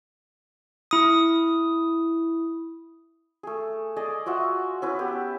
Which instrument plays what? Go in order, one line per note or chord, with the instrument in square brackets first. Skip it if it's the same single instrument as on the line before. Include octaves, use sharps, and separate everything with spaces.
[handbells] E4 D#6
[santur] A3 G#4
G#4 D5 D#5
F4 F#4 E5 F#5
C#4 E4 B4
B3 G4 B4